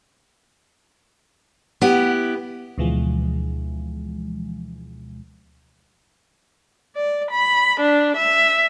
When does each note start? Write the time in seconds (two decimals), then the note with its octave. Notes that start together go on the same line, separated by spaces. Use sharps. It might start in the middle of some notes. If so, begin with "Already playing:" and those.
1.82 B3 E4 G4
2.78 D2 B2 E3 F3 G#3
6.96 D5
7.31 B5
7.80 D4
8.17 E5